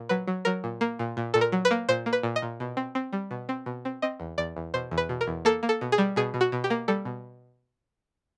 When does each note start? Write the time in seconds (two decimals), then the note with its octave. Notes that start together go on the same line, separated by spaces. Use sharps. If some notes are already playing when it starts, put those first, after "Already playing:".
Already playing: A#2
0.09 F#3 B4
0.28 F#3
0.45 F#3 A#4
0.64 A#2
0.81 A#3
0.99 A#2
1.17 A#2
1.34 A#2 A4
1.41 A#4
1.52 F#3
1.65 B4
1.71 A#3
1.89 A#2 C5
2.06 A#3
2.13 B4
2.23 A#2
2.36 D#5
2.42 A#2
2.60 B2
2.77 C4
2.95 C4
3.13 G3
3.31 B2
3.49 C4
3.66 B2
3.85 C4
4.02 C4 D#5
4.20 E2
4.38 E2 D5
4.57 E2
4.74 B2 C5
4.91 E2
4.98 B4
5.09 B2
5.21 A#4
5.27 E2
5.45 A#3 A4
5.63 A#3
5.69 A4
5.81 B2
5.92 G#4
5.98 G3
6.16 B2 G#4
6.34 B2
6.41 F#4
6.52 B2
6.64 G4
6.70 A#3
6.88 G3 A4
7.05 B2